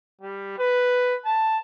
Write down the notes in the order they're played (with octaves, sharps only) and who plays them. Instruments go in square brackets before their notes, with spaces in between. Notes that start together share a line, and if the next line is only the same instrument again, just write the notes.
[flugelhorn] G3
B4
A5